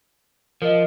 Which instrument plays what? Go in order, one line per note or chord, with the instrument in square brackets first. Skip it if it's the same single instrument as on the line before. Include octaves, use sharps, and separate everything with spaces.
[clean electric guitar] F3 [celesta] A#4 D#5